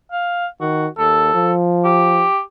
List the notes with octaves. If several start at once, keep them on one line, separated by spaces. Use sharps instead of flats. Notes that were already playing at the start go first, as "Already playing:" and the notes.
F5
D#3 F#4
D#2 A4
F3
G4